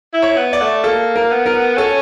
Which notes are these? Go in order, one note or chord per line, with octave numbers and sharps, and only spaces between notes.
E4
C#5
B3
D5
A3
A#3 A4
A#4
B3
A#4
C#4 A4